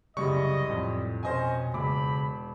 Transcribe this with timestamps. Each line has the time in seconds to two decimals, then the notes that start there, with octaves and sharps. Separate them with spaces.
0.17 C2 F#2 C#3 G3 D#5 C#6
0.69 F2 A2
1.23 B2 C#4 C5 D#5 G#5
1.74 E1 C#3 B5 D6